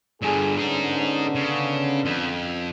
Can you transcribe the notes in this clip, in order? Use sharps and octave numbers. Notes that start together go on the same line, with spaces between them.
G2 D3 G#4
D3 B3 C#4 D#4 G#4
C#3
F2